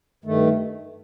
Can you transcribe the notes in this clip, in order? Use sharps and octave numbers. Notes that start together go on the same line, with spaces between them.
G2 D#3 A3